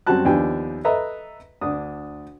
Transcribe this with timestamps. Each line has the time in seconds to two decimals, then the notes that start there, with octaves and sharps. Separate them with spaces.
0.07 F#2 G3 C4 F#4 A5 F#6
0.25 D#2 F3 B3 D4 G5 G#5
0.84 A4 B4 D#5 E5 A#5
1.61 D2 D4 D#6